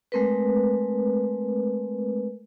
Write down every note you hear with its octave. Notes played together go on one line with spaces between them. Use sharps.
G#3 A3 C4 A#4 B4